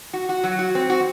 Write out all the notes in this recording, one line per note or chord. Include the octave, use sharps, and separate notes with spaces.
F#4
F#4
F#3
F#4
C4
F#4